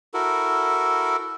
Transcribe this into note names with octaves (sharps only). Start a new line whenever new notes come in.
E4 F#4 A4 A#4